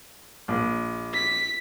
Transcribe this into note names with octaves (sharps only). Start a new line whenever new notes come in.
A#1
B6